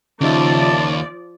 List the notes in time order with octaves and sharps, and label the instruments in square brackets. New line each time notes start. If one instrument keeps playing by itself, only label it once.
[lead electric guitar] D#2 [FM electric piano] C#3 D#4 E5 [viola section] F3 D5 [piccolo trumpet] A5